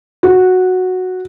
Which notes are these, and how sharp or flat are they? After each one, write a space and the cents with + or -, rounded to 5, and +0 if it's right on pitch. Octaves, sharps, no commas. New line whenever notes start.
F#4 -5